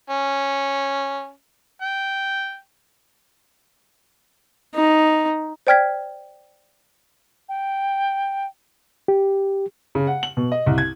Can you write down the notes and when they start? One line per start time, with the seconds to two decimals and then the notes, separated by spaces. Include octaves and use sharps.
0.10 C#4
1.82 G5
4.75 D#4
5.67 C5 D5 G5 F6 G#6 B6
7.49 G5
9.08 G4
9.95 C#3
10.07 F#5
10.23 F#7
10.37 B2
10.52 D#5
10.66 C2
10.78 G#6